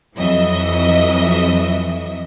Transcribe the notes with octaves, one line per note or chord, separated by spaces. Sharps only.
F2 E3 F#3 D#5 E5